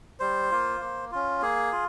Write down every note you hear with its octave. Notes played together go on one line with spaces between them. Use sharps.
G3 C5
A#3 F4
A#3
C#4 F4
A#3 G#4
F4